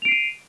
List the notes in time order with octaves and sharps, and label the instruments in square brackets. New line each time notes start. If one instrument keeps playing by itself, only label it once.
[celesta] F7
D7
C7
D#7